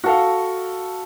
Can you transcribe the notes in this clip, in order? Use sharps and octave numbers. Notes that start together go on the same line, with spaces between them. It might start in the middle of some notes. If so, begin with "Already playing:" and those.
F#4 A4 F5